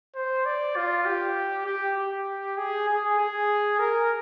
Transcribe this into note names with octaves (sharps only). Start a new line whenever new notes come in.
C5
D5
F4
G4
G4
G4
G#4
G#4
G#4
A#4